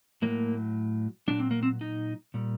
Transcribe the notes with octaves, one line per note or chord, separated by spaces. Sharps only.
A2 F#3 A#3
A#2 F#3 D4
C4
A#3
C4
D#4
A#2 G3